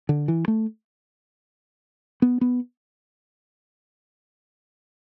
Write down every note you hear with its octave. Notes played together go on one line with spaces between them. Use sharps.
D3
E3
A3
B3
B3